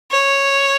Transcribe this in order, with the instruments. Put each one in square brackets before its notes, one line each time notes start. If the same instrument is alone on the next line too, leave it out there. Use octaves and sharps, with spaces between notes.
[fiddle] C#5